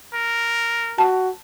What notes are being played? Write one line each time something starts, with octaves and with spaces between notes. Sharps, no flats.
A#4
F#4 A5